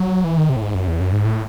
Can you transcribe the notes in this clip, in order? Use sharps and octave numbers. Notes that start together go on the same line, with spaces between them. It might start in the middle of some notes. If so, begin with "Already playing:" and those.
Already playing: F#3
E3
D#3
C3
A2
G#2
F#2
E2
F#2
G#2
A2